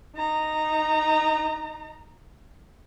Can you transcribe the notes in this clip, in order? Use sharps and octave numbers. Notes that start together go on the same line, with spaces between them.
D#4 A#5